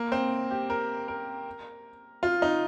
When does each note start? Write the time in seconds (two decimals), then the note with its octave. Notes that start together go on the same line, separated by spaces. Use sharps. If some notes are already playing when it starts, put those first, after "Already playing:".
Already playing: A#3
0.12 C4
0.51 G4
0.70 A#4
1.08 A#4
2.23 F4
2.42 D#4